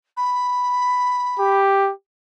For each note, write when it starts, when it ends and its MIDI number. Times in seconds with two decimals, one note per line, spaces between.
0.17 1.59 83
1.39 1.91 67